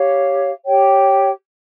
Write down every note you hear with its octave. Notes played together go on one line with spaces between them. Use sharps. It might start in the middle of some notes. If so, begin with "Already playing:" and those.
Already playing: G4 C#5 F5
G4 C#5 G5